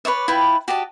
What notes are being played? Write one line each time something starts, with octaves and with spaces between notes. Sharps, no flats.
B4 C#5 D5 E5
E4 F4 B4 G5
F#4 G4 D#5 A5